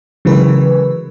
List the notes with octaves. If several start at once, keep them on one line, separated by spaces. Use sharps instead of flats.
C#3 E3 F#3 G#3 A#4 B4